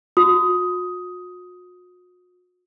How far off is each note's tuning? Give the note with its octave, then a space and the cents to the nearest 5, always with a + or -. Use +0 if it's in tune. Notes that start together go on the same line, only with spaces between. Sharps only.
F#4 -45 D#6 +10